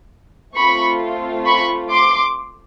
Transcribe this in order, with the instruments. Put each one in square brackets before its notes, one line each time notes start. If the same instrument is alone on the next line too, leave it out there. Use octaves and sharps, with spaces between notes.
[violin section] A3 C4 F4 B5 C#6
B5 C#6
C6 D6